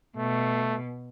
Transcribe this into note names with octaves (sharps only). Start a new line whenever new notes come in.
B2 A3